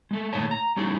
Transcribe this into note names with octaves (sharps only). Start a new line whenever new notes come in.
G#3 A3
A#2 D#3 A3 G#4 C#5 A5
A#5
G3 C#4 D#4 E4 G#4